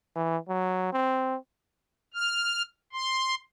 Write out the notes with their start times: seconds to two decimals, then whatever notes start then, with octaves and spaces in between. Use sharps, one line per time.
0.16 E3
0.49 F#3
0.93 C4
2.14 F6
2.93 C6